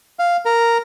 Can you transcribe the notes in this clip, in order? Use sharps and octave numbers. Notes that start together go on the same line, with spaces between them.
F5
A#4